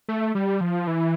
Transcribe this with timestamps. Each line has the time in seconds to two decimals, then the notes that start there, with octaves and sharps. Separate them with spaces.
0.09 A3
0.35 G3
0.61 F3
0.87 E3